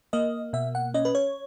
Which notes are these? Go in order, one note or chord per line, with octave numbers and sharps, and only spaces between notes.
A#3 D#5
B2 E5
F#5
C#4 D#5
B4
C#5